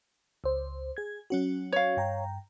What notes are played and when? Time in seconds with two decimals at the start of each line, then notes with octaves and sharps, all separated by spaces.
0.44 C#2 C5
0.97 G#4 G#6
1.30 F#3 C#4 F#4
1.72 C#5 F5
1.97 G2 G5 A#5